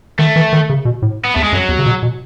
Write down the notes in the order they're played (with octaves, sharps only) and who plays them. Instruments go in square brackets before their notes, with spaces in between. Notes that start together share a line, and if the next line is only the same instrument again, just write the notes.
[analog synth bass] D#3 [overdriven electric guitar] A3
[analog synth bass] E3
D#3
C#3
B2
A2
[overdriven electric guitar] B3
[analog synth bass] E2 [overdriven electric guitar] A3
[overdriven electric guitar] G#3
[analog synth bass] F#2 [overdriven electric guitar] F#3
[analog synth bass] E2
C#3
B2
B2